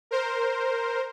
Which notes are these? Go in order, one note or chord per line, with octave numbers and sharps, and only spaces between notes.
A#4 C5